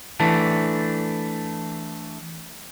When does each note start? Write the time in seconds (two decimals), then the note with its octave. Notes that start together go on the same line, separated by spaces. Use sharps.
0.20 E3 A3 D4